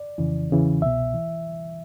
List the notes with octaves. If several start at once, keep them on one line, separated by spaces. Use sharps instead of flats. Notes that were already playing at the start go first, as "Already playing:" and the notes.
Already playing: D5
F2 C#3 E3
E2 C#3 E3
C2 B2 E5
E3